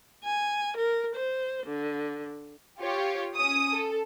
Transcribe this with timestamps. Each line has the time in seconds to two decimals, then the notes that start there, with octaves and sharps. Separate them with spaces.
0.24 G#5
0.77 A#4
1.14 C5
1.66 D3
2.79 F4 G4 C#5
3.36 C#4 D#6
3.73 A4